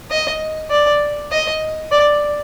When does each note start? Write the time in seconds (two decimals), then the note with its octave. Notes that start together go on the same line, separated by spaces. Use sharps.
0.11 D#5
0.71 D5
1.32 D#5
1.92 D5